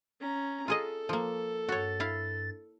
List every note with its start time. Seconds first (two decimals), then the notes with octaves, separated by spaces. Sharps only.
0.20 C#4 A#5
0.68 F4 G#4 A4 D#5
1.09 F3 A#3
1.69 G2 F#4 C#5 A6
2.00 E4 F5